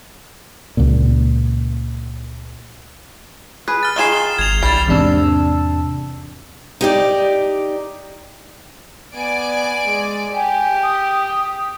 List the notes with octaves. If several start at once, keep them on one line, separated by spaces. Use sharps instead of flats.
C#2 A#2
G#4 B4
F6 A6
D#3 F4 G#4 C7 E7 G7
G#1 G#6 F7
B1 G3 A6 C7
E2 G#2 C3 D4 A5 E6
D#4 G4 D5
B3 D5 G#5 D7
G#3
G4 G5 G#5
D#6